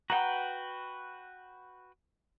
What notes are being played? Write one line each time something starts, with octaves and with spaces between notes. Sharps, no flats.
F#4 B4 F#5 G5 A#5